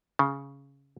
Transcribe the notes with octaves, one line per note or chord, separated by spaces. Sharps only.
C#3